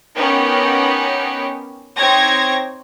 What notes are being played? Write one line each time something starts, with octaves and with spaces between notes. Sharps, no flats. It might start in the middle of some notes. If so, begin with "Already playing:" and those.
B3 C#4 D#4 G4 A#4
C4 D#4 G4 C#5 G#6 A#6